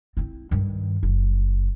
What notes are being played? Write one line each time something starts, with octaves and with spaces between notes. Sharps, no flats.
C4 E4
G2 D#3
F#1